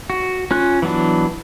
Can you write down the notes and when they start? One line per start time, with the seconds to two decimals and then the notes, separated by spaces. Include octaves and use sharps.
0.10 F#4
0.51 C#4 F4 F#6
0.82 E3 F#3 B3 D4